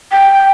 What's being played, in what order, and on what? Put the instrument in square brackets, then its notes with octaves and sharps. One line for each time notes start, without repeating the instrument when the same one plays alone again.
[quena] G5